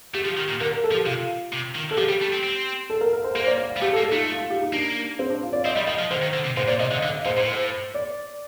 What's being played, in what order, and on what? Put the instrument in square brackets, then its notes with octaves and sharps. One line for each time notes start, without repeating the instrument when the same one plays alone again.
[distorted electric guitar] A3 [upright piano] G4
[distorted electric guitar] F3
D#3
A#2
[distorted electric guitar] D3 [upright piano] A#4
[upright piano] A#4
A4
[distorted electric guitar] F3
[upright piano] G4
[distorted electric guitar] C3 [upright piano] F4
[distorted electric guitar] C3
D#3
[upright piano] A4
[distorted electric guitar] F3 [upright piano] G4
[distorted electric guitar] G3
A3
C4
C4
[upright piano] A4
A#4
A#4
C5
[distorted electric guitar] A#3 [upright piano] C5
[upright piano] D5
F5
F5
[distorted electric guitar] G3
[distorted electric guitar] A3 [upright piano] G4
[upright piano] A4
[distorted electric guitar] A#3
[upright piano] A4
[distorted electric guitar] A3 [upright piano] D#4 F4
[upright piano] F4
F4
G4
D#4
[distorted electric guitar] A#3 [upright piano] D4
[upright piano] C4
D4
F4
D5
[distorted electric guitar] C4 [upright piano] D#5
[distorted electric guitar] G3 [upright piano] D#5
[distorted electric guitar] F3 [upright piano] D#5
[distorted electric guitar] F3
[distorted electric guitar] D3 [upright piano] C5
[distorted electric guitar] D#3
D3
C3
[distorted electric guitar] A2 [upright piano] C5
[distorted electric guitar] A#2 [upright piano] D5
[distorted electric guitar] C3 [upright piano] D#5
[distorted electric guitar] D3 [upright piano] D#5
[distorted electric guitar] D3 [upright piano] F5
[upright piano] D#5
[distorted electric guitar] A#2 [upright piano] C5
[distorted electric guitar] A2 [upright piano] C5
[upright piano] C5
D5